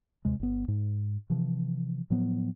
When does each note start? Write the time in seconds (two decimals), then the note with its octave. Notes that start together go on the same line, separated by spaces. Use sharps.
0.25 D#2 C3 G#3
0.40 G1 B3
0.68 G#2
1.30 C3 E3 F3
2.10 A2 F3 F#3 B3